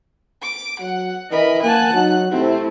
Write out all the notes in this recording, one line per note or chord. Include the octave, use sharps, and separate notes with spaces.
D6
F#3 F#5
E3 A#4 D#5 B5
A#3 F#5 G#5 A5 F#6
F#3 D#4
C3 A3 C4 E4